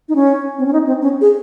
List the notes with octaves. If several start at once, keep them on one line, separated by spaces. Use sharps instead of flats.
D#4
C#4
C4
C#4
D#4
C4
C#4
G#4